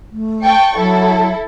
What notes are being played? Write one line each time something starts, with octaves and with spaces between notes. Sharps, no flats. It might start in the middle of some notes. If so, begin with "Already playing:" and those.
A3
G5 A5 C#6
F#3 E4 A4